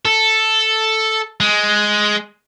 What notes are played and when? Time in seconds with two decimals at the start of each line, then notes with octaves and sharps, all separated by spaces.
0.05 A4
1.40 G#3